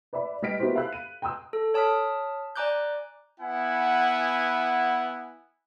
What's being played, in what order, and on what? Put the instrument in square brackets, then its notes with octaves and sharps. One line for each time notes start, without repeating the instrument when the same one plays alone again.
[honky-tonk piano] B4 D5 E5 B5
G3 B4 D#5 F6 B6 D7
A#3 B3 E4 F#4 G4 C5
F5 B5 E6 F#6
D#7
G5 A#5 C6 D#6 E6 F#6
[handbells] A4
C#5 A5 D#6 F6 B6
D5 G#5 A#5 D6 F#6 G6
[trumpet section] B3 E4 F#5 G#5